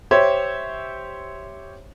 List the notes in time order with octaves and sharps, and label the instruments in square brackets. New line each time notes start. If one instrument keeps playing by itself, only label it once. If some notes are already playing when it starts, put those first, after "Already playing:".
[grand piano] G4 C5 C#5 E5